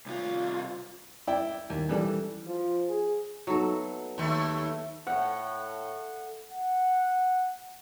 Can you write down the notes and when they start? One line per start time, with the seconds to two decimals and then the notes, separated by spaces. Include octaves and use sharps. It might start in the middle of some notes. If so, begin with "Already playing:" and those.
0.06 C2 F4
1.27 E4 D5 G5
1.70 D#2
1.89 E3 G3 A4
2.47 F3
2.89 G#4
3.47 F#3 A3 B3 D#4 A4
4.18 D#2 A3 E5 A5
5.07 A2 F#5
6.52 F#5